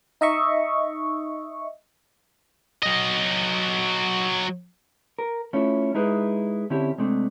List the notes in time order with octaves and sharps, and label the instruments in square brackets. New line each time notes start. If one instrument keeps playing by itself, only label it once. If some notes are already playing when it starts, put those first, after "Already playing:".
[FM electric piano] D#4 D#5 E5 C#6
[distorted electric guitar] F#3 D#5
[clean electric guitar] A#4
A3 C#4 E4 F4
G#3 D#4 E4 G#4 B4
D3 C4 C#4 E4 G4
C3 G#3 A3 C4 D4